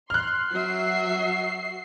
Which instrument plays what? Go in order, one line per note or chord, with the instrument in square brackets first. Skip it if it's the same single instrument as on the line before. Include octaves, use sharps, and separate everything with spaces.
[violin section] C6 [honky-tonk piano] F6 F#6
[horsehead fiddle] F#3 E5 [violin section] F#4 C7